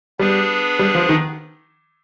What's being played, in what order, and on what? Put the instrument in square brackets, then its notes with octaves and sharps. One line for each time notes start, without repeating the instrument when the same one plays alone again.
[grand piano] G3 [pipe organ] B3 D4 G#4 B4
[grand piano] G3
F3
D#3